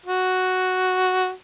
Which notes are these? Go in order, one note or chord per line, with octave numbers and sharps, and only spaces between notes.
F#4